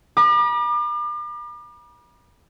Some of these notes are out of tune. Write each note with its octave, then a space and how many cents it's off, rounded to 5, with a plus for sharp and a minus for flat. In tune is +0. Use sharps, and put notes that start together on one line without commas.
B5 -45 D6 +40